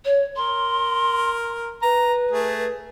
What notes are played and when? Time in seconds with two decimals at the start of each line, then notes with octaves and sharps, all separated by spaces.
0.05 C#5
0.36 A#4 C6
1.82 B4 A#5
2.31 A3 G#4